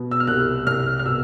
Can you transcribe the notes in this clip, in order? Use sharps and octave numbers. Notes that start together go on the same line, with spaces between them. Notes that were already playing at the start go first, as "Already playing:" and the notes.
Already playing: B2
E6
F6
C2 F#6
C2 F6
F6
B2 E6